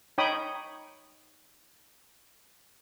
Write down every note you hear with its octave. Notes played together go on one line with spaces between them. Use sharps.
D#4 C#5 G5 B5 D#6